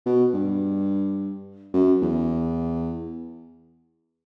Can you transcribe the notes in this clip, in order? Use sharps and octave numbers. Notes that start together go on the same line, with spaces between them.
B2
G2
F#2
E2